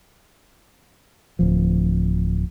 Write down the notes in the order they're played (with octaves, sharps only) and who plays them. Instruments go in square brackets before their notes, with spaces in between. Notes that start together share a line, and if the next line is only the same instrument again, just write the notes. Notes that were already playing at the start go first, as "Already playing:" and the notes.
[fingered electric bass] D1 F3